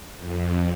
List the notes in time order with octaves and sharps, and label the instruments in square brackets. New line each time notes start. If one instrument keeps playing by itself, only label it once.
[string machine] F2